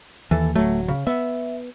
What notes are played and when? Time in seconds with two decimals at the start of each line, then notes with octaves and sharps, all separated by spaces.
0.31 D#2 E3 A4
0.55 D1 F#3 A3
0.88 C#3
1.07 B3 E5